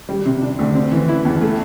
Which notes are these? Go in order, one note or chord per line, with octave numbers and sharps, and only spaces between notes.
G3
C3
D4
D2
C4
E3
E4
E2
A3